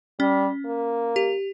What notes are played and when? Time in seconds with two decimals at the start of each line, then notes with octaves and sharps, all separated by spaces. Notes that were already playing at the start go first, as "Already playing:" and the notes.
0.20 G3 C#4
0.65 A#3
1.16 G4